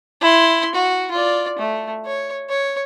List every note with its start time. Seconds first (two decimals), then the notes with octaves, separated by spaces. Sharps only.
0.21 E4 C6
0.75 F#4
1.11 F4 D5
1.59 A3
2.05 C#5
2.49 C#5